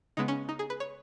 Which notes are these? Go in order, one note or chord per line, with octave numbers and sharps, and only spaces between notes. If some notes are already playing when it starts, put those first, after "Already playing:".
C#3 G#3 B3 D#4
C#4
D#4
G#4
B4
C#5